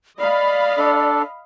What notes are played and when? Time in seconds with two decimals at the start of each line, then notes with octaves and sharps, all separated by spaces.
0.20 D5 D#5 F5 B5
0.78 D4 A4